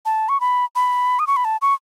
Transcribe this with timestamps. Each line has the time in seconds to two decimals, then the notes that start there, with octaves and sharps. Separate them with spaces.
0.06 A5
0.29 C#6
0.41 B5
0.76 B5
1.19 D#6
1.27 C#6
1.36 B5
1.45 A5
1.62 C#6